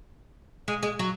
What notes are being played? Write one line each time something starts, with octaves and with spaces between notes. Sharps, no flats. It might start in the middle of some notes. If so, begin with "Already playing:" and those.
G#3
G#3
F#3